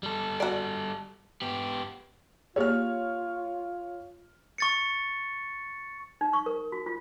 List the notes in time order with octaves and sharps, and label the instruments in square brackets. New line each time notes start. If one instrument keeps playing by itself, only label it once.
[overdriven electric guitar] G3 A4
[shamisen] F#4 D5
[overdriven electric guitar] B3 G4
[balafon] A#3 G4 G#4 [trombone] F4 [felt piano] C#5 F6
[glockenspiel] C#6 A6 C#7
[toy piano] D#4
C#6
A#4
F#4
F4